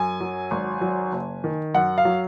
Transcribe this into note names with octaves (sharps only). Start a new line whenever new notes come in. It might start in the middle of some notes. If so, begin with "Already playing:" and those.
Already playing: F#2 G#5
F#3
G#1
F#3
F#1
D#3
F#2 F#5
F5
F#3